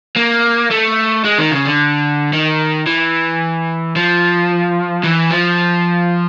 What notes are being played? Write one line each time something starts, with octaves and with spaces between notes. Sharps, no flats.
A#3
A3
G#3
D#3
C#3
D3
D#3
E3
F3
E3
F3